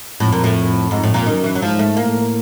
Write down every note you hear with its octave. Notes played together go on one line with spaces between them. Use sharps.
F2 A2
A#2
A2
F2 G#2
A2
A#2
F#2 D#3
E3
F#3
G#2 F3
A3
A2 A#3